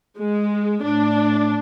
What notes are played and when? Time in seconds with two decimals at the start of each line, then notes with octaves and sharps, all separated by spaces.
0.18 G#3
0.83 A2 D4